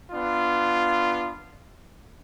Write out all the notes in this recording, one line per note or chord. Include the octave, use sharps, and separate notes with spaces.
B3 D4 F4